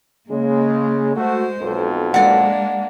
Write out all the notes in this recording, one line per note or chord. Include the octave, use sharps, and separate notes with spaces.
C#3 G#3 A#3
G#3 A3 F#4 C5
B1 F2
G#3 A#3 D4 D5 F#5